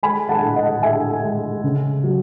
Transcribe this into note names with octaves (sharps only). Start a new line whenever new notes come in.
G#3 G#5 B5
F#5 A5
A2
D#5 F#5
A2 E5 G#5
G#3
C#3
F#3